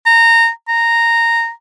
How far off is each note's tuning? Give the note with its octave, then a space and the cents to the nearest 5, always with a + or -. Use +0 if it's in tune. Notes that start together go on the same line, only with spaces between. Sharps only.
A#5 -20
A#5 -10